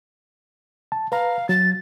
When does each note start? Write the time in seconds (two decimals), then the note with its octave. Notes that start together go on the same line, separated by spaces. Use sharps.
0.92 A5
1.12 B4 F5 A#5
1.49 F#3 A6